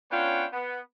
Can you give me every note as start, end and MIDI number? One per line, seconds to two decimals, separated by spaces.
0.11 0.45 59
0.11 0.45 61
0.11 0.45 62
0.11 0.45 65
0.11 0.45 73
0.11 0.45 79
0.53 0.79 59